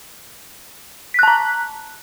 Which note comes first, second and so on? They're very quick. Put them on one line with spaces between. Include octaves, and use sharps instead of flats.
B6 F#6 A5 A#5